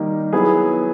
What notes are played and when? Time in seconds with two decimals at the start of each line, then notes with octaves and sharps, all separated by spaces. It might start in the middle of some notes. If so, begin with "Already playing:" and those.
Already playing: D#3 G3 A#3 D#4
0.33 F#3 B3 E4 G#4